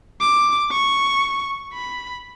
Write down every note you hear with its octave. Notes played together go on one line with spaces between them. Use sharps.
D6
C#6
B5